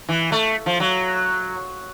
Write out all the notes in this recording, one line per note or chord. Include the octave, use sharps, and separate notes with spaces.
E3
A3
F3
F#3